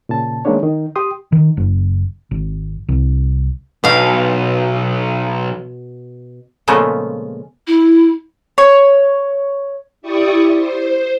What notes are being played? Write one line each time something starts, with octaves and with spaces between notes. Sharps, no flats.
A#2 C#3 A5
D#3 G#3 A#3 B3 D4 C#5
D#3
G4 G5 C6 D#6
D#3
F#1
G#1
C2
B1 B2 F5
A#2 C#3 F3 G#3 A3 B3
E4
C#5
E4 G4 D5 C#6 D#6
C5